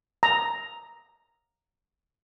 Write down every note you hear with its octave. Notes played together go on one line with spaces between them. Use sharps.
A#5